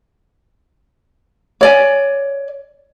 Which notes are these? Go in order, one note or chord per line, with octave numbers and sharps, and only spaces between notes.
C#5 D5 G#5